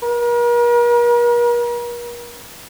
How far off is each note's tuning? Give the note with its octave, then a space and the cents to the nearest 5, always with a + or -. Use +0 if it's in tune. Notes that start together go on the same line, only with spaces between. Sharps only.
A#4 +45